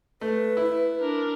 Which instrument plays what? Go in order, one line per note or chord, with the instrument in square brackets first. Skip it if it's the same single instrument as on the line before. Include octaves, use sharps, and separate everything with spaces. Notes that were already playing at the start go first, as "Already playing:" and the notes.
[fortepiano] A3 [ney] B4
[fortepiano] E4
[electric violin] D4 A#4